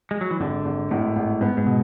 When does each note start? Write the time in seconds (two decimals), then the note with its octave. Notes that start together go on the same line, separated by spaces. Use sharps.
0.11 G#3
0.21 F#3
0.31 E3
0.40 G#1 D3
0.65 G#1
0.91 G#1 A2
1.16 G#1
1.41 G#2 B3
1.57 G#2
1.66 B2